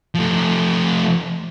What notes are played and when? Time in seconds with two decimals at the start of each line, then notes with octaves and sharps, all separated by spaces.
0.15 F3 A3